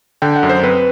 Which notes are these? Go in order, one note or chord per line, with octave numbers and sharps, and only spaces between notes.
D3 G5
F#5
F#2
C5
C4 B4